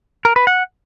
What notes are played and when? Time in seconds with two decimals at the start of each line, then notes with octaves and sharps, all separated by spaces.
0.25 A#4
0.36 B4
0.47 F#5